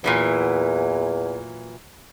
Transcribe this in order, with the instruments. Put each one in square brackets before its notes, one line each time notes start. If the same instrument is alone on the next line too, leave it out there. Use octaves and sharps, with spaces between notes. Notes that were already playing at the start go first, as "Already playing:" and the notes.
[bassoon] E2 [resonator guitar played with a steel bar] A#2 E3 F#3